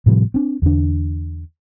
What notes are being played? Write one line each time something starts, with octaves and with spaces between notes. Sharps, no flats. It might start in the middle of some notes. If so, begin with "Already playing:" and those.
A2 C3 F3 G3
C4 D4
E2 D3 D4